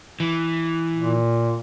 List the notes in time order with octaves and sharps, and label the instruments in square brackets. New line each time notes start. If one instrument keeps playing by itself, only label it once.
[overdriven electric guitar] E3
[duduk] A#2